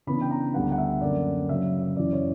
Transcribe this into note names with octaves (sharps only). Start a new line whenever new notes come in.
C#3 E3 B3 D4 B5
G5
A#5
D2 D3 G3 B3 F#5
F#5
E5
F#2 D3 A#3 C#4 D5
F#2 C#3 F#3 E5
F#2 C#3 E3 D5
C#5